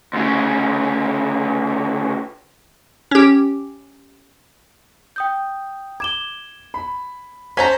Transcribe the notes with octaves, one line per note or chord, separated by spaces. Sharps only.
D2 C#3
C#4 G4
G5 D#6 G6
D6 G#6 E7 G7
B5
C#4 C5 A5 A#5 G#6 B6